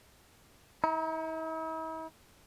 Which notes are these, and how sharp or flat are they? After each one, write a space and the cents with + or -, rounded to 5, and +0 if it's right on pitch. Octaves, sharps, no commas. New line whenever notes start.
E4 -45 A#5 +20